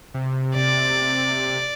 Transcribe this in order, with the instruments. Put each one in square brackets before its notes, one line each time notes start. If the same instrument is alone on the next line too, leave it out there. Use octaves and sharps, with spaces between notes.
[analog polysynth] C3
[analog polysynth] C3 [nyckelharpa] D5